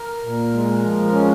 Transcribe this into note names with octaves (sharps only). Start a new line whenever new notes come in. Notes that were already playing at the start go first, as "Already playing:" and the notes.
Already playing: A#4
A#2
G#3
F3
G#3 C#4